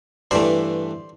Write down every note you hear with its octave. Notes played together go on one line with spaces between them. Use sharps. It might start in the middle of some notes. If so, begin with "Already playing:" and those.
G2 E3 A3 C5 D5